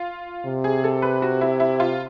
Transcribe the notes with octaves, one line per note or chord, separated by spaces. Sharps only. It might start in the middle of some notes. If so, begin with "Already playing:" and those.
Already playing: F4
C3
G#4
A4
B4
F#4
E4
E4
F4